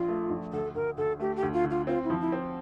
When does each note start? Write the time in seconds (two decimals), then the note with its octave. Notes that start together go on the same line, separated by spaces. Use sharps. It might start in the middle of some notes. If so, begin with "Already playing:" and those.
Already playing: A#1 F4
0.08 A3
0.30 A#1
0.53 D2 A4
0.75 D2 A#4
0.97 D2 A4
1.20 A3 G4
1.36 G4
1.43 D2
1.53 F4
1.64 D3
1.70 F4
1.87 C4 F4
2.04 E4
2.10 F3
2.21 E4
2.32 C4